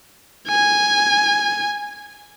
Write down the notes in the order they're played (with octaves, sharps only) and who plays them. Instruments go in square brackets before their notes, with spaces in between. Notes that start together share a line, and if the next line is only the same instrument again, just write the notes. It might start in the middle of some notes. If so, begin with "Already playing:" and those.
[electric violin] G#5